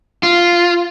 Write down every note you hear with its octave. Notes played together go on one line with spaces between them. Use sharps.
F4